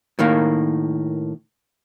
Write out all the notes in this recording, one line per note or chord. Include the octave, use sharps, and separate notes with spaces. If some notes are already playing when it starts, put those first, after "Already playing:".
A2 D#3 A#3